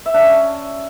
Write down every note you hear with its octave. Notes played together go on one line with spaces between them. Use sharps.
E5
D4
C#4